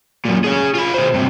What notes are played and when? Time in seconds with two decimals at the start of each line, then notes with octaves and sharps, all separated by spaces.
0.25 F#2 A#2
0.44 G#4 C#5
0.75 F4 B5
0.94 B2 C5
1.14 G2 C3